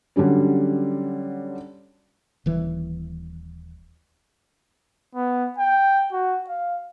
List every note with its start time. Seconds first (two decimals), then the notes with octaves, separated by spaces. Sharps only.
0.16 D3 F#3 G3 C#4
2.46 D#1 E3
5.15 B3
5.58 G5
6.12 F#4
6.49 F5